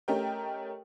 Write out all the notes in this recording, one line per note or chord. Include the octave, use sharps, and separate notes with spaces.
A3 C#4 G4 A#4 D#5 G5